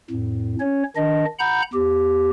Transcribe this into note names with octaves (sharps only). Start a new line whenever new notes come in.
F2 A2
C#4 C#5
D#3 D4 D#5
F#5 A#5 B5 G6
E2 G4